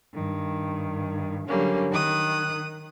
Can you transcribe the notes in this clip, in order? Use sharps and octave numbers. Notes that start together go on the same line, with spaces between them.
G2 D#3
D3 F#3 G3 A#3 C#4
D#3 D#6 F#6